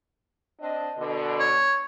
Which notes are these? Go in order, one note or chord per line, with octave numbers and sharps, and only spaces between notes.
C4 D4 D#5
B2 D3
C#5